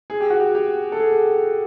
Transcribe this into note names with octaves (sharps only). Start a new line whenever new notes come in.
G#4
G4
F#4
G4
G4
A4
G#4